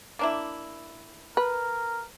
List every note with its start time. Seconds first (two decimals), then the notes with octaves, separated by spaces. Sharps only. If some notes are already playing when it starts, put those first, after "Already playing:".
0.19 A#3 D4 E4
1.37 A#4 B4